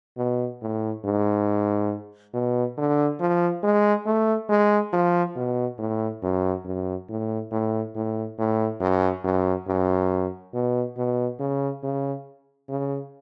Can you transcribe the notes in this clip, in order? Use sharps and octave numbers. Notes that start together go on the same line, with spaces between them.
B2
A2
G#2
B2
D3
F3
G#3
A3
G#3
F3
B2
A2
F#2
F#2
A2
A2
A2
A2
F#2
F#2
F#2
B2
B2
C#3
C#3
C#3